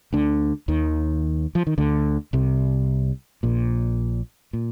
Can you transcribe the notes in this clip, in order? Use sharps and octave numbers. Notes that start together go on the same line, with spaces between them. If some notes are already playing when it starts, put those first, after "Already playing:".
D2 D3
D#2 D#3
F3
D#3
D2 D3
C2 C3
A#1 A#2
A#2